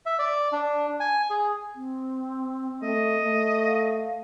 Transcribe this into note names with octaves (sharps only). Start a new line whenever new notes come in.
E5
D5
D4
G#5
G#4
C4
A3 D#5
A3
F5